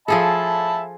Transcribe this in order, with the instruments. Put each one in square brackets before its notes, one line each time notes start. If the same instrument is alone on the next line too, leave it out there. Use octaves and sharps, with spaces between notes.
[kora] F3 G#4 A4 [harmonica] E5 A5 B5